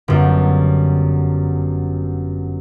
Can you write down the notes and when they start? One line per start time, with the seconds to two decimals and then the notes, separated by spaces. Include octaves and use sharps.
0.08 G1 F#2